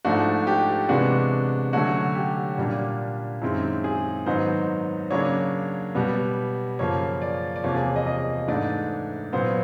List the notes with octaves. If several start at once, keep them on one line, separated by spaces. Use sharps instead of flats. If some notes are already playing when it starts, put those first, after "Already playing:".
G#2 F3 A3 D4 F#4
G4
C3 E3 G#3 B3 D4 F#4
D3 F#3 A3 C#4 F#4
G4
A#2 G3 A#3 D4
F#2 D#3 G#3 C4 E4
G#4
G#2 D#3 F#3 B3 D#4 C5
C#3 F#3 A#3 D4 C#5
B2 G3 B3
F#2 C#3 F3 A#3 C#5
D5
D5
E2 C3 F3 A#3 C#5
G#4
D#5
D#5
G#2 E3 A3 D4 D5
A#2 F#3 B3 C5